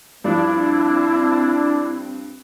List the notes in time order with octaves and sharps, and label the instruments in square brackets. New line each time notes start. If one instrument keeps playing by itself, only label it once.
[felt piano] G2 F3 [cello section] C4 [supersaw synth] D4 [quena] E4